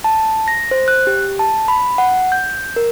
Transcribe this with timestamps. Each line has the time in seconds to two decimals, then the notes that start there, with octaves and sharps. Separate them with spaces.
0.04 A5
0.48 A#6
0.71 C5
0.88 F#6
1.07 G4
1.39 A5
1.68 B5
1.98 F#5
2.32 G6
2.76 A#4